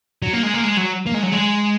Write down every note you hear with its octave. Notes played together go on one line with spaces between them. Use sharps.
F#3
A#3
G#3
A#3
G#3
F#3
A#3
G#3
F#3
G#3